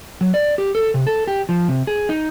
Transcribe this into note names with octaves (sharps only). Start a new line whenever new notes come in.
F#3
D5
G4
A4
C3
A4
G4
F3
C3
G#4
D#4